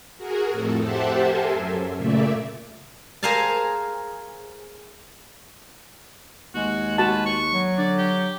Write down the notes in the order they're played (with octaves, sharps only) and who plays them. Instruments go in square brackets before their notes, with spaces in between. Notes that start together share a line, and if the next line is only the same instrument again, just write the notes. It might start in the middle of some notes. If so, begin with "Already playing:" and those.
[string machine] F#4 G#4 A#4
F2 A2 A4
G4 C5 E5 F#5 A5
A4 A#4 E5 G#5 C6
F#2
A#2 C#3 A3 A#3 D5 E5
[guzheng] G#4 A#4 C5 F5 G#5 A5
[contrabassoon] D#2 [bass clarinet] G#3 [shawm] F#4
[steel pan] F#4 A5 [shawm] B4
[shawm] C#6
[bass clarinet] F#3
[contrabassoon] D3 [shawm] D5
[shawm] G4